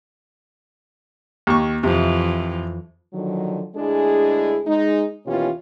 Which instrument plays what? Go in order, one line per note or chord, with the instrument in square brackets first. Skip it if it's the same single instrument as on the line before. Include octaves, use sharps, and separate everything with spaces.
[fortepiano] D#2 C#6
[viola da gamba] F2 E3 [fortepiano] C3
[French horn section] D3 D#3 F3 F#3
D2 G#3 D4 E4 G#4
G#3 D#4
D#2 B2 E3 C#4 F4 G4